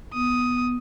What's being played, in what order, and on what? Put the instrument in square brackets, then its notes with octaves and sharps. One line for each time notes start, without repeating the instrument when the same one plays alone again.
[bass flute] B3 [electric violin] D#6